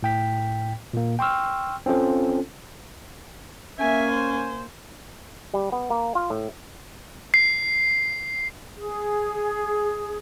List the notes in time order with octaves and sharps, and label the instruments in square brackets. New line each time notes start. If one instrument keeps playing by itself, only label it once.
[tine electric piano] A2 G5 B6
A#2 A#3
G5 C6 C#6 E6 F6
C4 C#4 F4 A4 C5
[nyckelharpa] A#3 G#5 [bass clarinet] C#4 [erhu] E5
[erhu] C5
[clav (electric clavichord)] G3
B3
A#3
F4
A2
[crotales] C7
[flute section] G#4